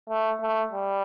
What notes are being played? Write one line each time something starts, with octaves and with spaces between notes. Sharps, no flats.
A3
A3
G3